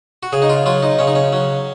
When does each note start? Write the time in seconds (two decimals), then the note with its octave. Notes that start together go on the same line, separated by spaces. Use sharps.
0.23 F#4
0.33 C#3 G#4
0.42 D#4
0.49 F4
0.66 F#3 F4
0.83 D#4
0.99 C#3 C#4
1.07 D#4
1.15 C#4
1.33 F#3